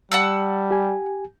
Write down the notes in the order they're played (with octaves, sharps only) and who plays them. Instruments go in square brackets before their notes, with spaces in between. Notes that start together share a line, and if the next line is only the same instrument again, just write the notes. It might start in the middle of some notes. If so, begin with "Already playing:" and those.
[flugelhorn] G3 [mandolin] F#5 A5 E6
[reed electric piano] G4 G#5